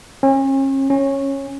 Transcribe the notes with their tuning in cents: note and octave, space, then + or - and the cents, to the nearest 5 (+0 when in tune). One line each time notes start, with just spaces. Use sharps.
C#4 -40
C#4 -15